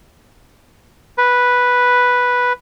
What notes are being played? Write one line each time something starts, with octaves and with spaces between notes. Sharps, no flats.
B4